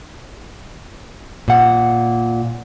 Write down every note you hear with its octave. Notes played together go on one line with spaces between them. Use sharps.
A#2 F#5